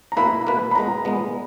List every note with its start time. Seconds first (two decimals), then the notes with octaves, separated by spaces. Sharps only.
0.12 A#5
0.17 B2 A#3 E4 B4 B5
0.46 B2 A#3 E4 B4
0.71 B5
0.75 A#2 G#3 B3 A#5
1.05 A#2 G#3 B3